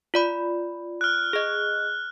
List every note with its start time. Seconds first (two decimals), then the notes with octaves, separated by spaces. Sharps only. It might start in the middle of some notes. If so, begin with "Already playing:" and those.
0.14 F4 D5 B5
1.01 F6 F#6
1.33 G#4 D#5